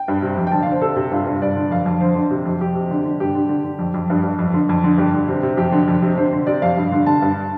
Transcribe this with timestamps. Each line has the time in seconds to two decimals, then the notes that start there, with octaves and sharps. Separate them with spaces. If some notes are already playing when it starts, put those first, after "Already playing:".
Already playing: G5
0.08 G2
0.22 C3
0.37 F2
0.47 G5
0.52 D3 A5
0.63 D3 F5
0.72 C5
0.81 C3 A4
0.97 C3
1.11 G2 F4
1.26 G2
1.42 G2 D5
1.56 D3
1.71 F2 F5
1.86 F2
2.01 D3 C5
2.16 D3
2.31 C3
2.45 F2
2.60 F2 G4
2.75 C3
2.91 D3
3.05 D3
3.20 G2 G4
3.35 D3
3.49 D3
3.64 D3
3.79 F2
3.94 F2
4.10 G2
4.23 G2
4.39 F2
4.54 D3
4.69 F2
4.84 D3
4.98 G2 G4
5.14 D3
5.28 C3
5.43 C3
5.57 F2 G4
5.72 D3
5.88 F2
6.02 C3
6.17 D3 C5
6.32 D3
6.47 C3 D5
6.62 F2 F5
6.77 G2
6.92 D3
7.06 D3 A5
7.22 G2